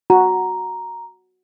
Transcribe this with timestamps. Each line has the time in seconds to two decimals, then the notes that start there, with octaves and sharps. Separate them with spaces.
0.10 F#4 A#5